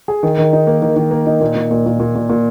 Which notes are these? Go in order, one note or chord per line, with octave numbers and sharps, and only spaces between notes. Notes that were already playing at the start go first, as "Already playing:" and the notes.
G#4
D#3
D#3
D#4
A#3
D#3
D#3
A#3
D#4
A#2
A#2
A#2
A#2
A#2
A#2
A#2